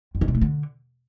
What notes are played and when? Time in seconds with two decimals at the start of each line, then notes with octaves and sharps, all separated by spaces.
0.15 F2
0.21 D#3
0.28 C3
0.35 A3
0.41 D3